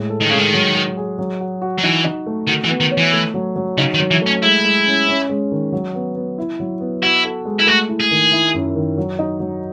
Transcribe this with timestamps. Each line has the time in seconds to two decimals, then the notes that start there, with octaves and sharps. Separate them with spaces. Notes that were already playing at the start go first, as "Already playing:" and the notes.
Already playing: A2 G#3
0.10 A4
0.20 D#3
0.29 C#3 G#3
0.38 D#3
0.54 F#3
0.75 G#4
0.97 G#4
1.18 F#3
1.40 F#4
1.62 F#4
1.78 F#3
1.83 E3 D#4
2.04 D#4
2.26 A3
2.48 D#3 F#4
2.64 E3
2.69 B3
2.80 D#3
2.91 C#5
2.97 E3
3.13 A3
3.34 F#3
3.56 F#3
3.78 C#3 D#4
3.94 D#3
4.00 F#3
4.11 E3
4.22 A3
4.27 C#4
4.43 G#3 E4
4.64 G#3
4.86 C#4
5.08 C#4
5.29 G#3
5.52 D#3
5.72 F#3
5.95 B3
6.15 B3
6.38 E4
6.60 F#3
6.80 B3
7.02 E4 F#4
7.25 A4
7.45 G#3
7.59 E4
7.67 A3 F#4
7.89 E4
8.00 G#4
8.11 D#3
8.32 E4
8.54 F#2
8.76 D#3
8.98 F#3
9.19 D#4
9.40 F#3